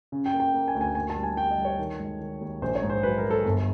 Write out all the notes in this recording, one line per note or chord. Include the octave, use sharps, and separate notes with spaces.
C#3
G5
A#3
G5
A#3
G#5
D2
G#5
A#3 G#5
A5
G3
G#5
G3 G5
D#5
G3
C#5
D#3
G#3
D#3
D#2
A#1 C5
C#5
G#2
C5
F#3 B4
A#4
F#3
A4
G1